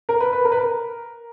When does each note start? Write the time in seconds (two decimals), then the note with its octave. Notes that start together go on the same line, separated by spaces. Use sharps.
0.09 A#4
0.20 B4
0.33 B4
0.45 A#4
0.52 B4
0.57 A#4